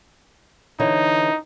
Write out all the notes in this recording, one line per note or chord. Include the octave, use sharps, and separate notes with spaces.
D3 E3 D#4 C#5